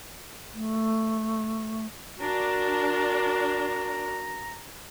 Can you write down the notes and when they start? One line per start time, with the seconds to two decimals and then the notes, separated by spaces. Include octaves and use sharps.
0.54 A3
2.21 D4 F#4 A#4 A#5